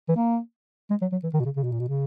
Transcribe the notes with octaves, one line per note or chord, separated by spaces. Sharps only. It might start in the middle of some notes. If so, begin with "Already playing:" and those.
E3
A#3
G#3
F#3
F#3
E3
D#3
B2
C#3
C#3
B2
A#2
B2
C#3